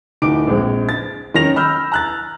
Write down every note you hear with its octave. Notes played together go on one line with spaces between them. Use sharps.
D1 D#4 D6 D7
A#1 G#3 C4
A6
D#3 C#4 A#6 F7
B5 E6 F6 G6
A#5 F#6 A6